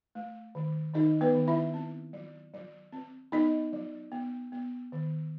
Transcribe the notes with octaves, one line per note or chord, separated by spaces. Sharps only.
A3
D#3
D#3 D#4 D#5
B3 B4
D#3
E4 E5
C4
F#3
F#3
C4
B3 D#4 D#5
F#3
B3
B3
D#3